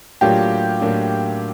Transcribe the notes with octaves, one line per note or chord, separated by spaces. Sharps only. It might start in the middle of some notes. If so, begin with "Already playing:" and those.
A2 F#3 A#3 D4 F4 G4
A2 F#3 A#3 D4